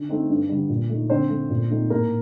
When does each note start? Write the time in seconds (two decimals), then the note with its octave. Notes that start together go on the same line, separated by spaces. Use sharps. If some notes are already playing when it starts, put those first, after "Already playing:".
Already playing: D3
0.09 A3 C4 D#4
0.29 G2
0.49 D3 G3
0.69 A#2
0.90 A3 D#4
1.10 D3 C4 C5
1.30 A3 C4
1.50 A#2
1.70 A3 C4 D#4
1.90 A2 A#3 A#4